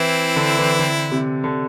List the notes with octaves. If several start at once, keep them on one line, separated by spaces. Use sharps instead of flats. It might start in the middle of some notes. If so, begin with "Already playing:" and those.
Already playing: E3 C4 E4
D3
E3
D3
C3
D3